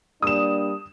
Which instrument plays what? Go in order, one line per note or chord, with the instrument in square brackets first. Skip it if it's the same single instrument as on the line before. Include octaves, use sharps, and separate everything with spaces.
[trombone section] G3 A#3 D4 [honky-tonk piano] D#6 E7